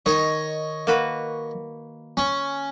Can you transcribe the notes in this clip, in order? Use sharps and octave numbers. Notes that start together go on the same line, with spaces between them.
D#3 C#5 D#5
A#3 F#4 B4
C#4